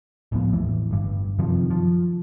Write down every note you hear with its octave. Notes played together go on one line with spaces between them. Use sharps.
D1 A1 F3 B3
E2 A2 E3
G1 G2
F#2 C3 D#3 F3
F3